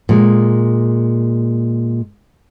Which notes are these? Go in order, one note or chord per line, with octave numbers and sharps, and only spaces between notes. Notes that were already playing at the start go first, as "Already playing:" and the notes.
A#2 G#3